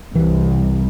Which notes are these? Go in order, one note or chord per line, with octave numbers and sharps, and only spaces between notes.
C2 E3